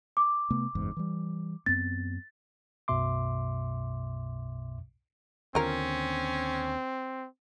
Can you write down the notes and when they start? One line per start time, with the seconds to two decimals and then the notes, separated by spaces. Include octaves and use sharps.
0.17 D6
0.50 C3 A3 B3
0.75 F#1 E2 G#2
0.97 E3 G3
1.66 F#2 B3 C4 A6
2.88 B1 F#2 B2 E5 C6 D6
5.55 D#2 D3 C4 C#4 F4 A#4